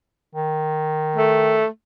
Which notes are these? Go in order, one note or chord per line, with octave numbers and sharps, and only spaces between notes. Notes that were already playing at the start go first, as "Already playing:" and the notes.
D#3
A3